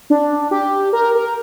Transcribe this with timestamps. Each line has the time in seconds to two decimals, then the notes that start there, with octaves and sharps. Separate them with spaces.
0.10 D4
0.51 G4
0.93 A#4
1.15 A#4